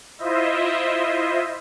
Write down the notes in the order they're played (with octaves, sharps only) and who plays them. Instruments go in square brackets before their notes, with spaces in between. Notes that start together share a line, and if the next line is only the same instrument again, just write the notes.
[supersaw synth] E4 F4 C5 D#5 E5